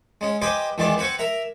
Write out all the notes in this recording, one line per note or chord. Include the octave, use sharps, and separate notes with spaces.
G#3 C#4
G4 B4 C5 D#5 G5 G#5
E2 D#3 E3 G#3 D5
C4 B4 F#5 G#5 C#6
A#4 E5 A#5